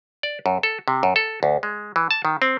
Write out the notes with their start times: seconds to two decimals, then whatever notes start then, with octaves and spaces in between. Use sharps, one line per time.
0.23 D5
0.46 F#2
0.63 A4
0.88 C3
1.03 F#2
1.16 A4
1.43 D2
1.63 G#3
1.96 E3
2.11 A5
2.25 D#3
2.42 C4